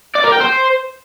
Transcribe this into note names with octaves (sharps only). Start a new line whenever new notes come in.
D5
A#4
G5
C5